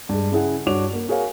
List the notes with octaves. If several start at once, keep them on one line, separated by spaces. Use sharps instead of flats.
G2 G#3
C#3 E4 G#4 F#5
G2 D4 F#4 C#5 D6 F7
A#3
F#4 G#4 A#4 C#5 F5 G#5